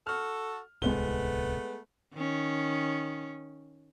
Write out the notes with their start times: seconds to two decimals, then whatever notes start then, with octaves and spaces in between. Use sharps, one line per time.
0.07 F#4 A4 F6
0.82 D1 C2 G#3 A3 B3 G7
2.14 D#3 C#4